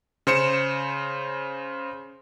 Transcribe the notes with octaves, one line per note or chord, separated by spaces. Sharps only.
C#3 C5 C#7 E7